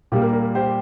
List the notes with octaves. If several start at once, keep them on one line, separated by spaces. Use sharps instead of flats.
A#2 G3 A#3 G4
A#4
A#4
G4 C5